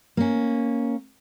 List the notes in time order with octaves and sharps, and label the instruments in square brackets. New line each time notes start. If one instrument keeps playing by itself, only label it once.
[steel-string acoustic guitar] A#3 C#4